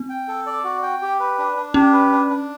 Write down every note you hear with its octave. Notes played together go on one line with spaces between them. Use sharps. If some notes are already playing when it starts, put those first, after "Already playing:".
Already playing: C4
G5
A4
D5
F#4
G5
G4
B4
D4
D4
C#4 G4
B4
D4
D4